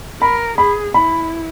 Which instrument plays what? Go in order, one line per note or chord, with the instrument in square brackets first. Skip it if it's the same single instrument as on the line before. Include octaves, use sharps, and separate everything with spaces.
[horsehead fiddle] A#4 [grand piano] B5
[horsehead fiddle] G#4 [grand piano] B5
[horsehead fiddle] E4 [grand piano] B5